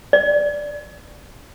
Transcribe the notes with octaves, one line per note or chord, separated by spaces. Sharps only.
D5